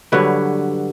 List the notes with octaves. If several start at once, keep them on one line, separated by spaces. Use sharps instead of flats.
G2 D3 F#3 B4